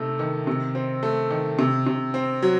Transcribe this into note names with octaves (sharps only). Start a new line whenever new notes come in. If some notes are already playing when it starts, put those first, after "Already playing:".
Already playing: C3 A3 D#4
D#3
C3
C4
A3
D#3
C3
C3
C4
F#3